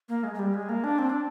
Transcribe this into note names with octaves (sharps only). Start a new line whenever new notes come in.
A#3
G#3
G#3
G3
G#3
A#3
D4
C4
D4